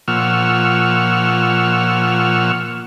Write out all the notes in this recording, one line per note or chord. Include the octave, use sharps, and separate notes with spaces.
A#2 F3 F#5 C#6 E6 F6